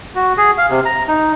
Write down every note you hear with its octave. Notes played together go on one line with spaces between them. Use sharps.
F#4
G#4
F5
C3
A#5
D#4